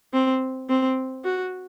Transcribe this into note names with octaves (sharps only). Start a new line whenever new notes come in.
C4
C4
F#4